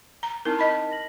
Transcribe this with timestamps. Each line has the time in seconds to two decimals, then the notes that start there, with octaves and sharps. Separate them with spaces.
0.23 A#5
0.45 C4 D#4 E4 A#4 A5 F6
0.59 D#5 B5
0.91 A#6 F#7